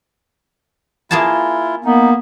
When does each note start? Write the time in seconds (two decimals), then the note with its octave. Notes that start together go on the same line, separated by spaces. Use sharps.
1.11 A#3 E4 F4 G#4 A5
1.85 A#3 B3 D#4